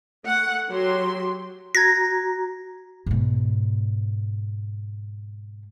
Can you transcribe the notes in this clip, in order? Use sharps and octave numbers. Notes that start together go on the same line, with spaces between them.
A3 F#5
F#3 G4 C6
F#4 A#5 G#6 A#6
G#2 B2